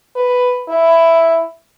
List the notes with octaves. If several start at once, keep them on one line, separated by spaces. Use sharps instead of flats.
B4
E4